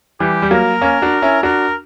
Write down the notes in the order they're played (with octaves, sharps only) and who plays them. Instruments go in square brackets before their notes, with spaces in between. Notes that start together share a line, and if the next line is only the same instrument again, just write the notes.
[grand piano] E3 G3 [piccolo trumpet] G4
[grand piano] G3
[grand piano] F#3 A#3 [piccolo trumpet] A#4
[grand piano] A#3 C#4
D4 F#4
C#4 E4
[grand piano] D4 F#4 [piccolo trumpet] A#4